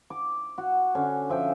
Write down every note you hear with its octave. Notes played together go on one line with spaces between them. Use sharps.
D6
F#4
D3 C#4
F3 E5 G5 G#5